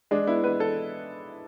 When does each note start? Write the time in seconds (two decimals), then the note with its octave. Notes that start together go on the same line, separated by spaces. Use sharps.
0.11 G#3 D4
0.27 B3 E4
0.44 B3 B4
0.60 A4